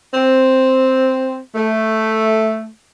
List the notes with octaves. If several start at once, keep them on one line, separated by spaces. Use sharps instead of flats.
C4
A3